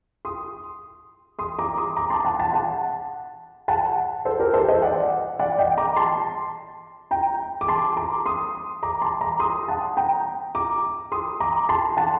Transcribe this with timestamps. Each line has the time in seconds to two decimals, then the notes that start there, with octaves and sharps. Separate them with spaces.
0.25 C6 D#6
1.39 C6 D#6
1.59 A#5 D6
1.77 C6 D#6
1.96 A#5 D6
2.10 A5 C6
2.24 F#5 A5
2.39 F#5 A5
2.53 F#5 A5
3.68 F#5 A5
4.25 A4 C5
4.39 G4 A#4
4.53 A4 C5
4.69 C5 D#5
4.82 D5 F#5
5.39 D5 F#5
5.59 D#5 G5
5.77 A#5 D6
5.97 A5 C6
7.11 G5 A#5
7.61 D6
7.68 A5 C6
7.97 A#5 D6
8.26 C6 D#6
8.83 A#5 D6
9.02 A5 C6
9.21 A#5 D6
9.40 C6 D#6
9.68 F#5 A5
9.97 G5 A#5
10.55 A#5 D6
11.12 C6 D#6
11.40 A#5 D6
11.69 A5 C6
11.97 F#5 A5